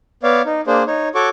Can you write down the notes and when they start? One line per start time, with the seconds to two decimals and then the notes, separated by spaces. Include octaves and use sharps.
0.23 B3 C#5 D5 F5
0.45 D#4
0.67 A#3 D4 G#4 C5
0.87 D#4 C#5
1.15 F#4 A4 C#5 C#6 D6